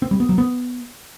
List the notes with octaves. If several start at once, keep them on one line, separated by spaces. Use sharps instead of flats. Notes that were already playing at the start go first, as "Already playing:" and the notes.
C4
G3
B3
F#3
B3